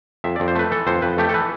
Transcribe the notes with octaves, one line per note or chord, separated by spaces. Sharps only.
F2 E5
F2 D5
C5
A3 B4
E3 A4
F2 C5
F2 B4
A3 G4
A4
E3 B4